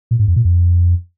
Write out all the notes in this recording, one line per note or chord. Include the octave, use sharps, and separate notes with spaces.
A#2
G#2
F2
A#2
F2